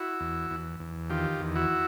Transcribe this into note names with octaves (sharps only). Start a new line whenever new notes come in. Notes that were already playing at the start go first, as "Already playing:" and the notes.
Already playing: E4 F#4
E2
E2
E2
D#3 F4 G4
E2
E4 F#4